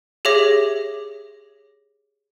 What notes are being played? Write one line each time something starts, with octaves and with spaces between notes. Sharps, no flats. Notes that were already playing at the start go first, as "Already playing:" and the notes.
G4 G#4 C#5 E5 D6 A#6